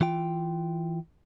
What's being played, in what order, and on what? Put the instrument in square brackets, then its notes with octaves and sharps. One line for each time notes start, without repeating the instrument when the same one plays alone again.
[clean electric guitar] E3 F4 G5